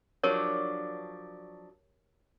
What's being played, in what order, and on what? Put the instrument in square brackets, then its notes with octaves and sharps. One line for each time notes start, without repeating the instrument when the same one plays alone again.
[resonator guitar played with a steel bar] F3 F#3 D4 [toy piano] G4 A#4 C#5